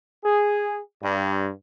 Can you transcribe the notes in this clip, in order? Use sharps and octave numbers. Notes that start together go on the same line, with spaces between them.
G#4
G2